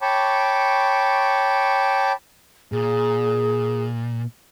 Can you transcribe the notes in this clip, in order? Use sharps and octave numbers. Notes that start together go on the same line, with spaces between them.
C#5 G5 A5 B5 C#6 D6
A#2 G#4